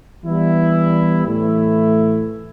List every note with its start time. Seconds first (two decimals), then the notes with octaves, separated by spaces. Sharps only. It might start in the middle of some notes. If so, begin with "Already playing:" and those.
0.24 E3 G3 B3 E4
1.26 A2 E3 A3 E4